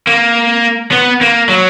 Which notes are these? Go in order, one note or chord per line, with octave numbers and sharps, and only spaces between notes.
A#3
B3
A#3
F#3